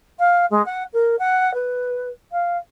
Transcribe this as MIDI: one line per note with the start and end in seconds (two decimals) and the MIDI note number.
0.19 0.46 77
0.51 0.64 56
0.66 0.83 78
0.93 1.16 70
1.19 1.54 78
1.54 2.09 71
2.32 2.57 77